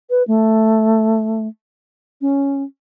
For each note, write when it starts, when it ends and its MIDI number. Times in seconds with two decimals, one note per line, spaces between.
0.10 0.23 71
0.27 1.47 57
2.21 2.63 61